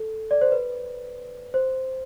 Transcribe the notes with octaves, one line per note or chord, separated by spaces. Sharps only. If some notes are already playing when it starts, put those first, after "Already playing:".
Already playing: A4
D5
C5
B4
C5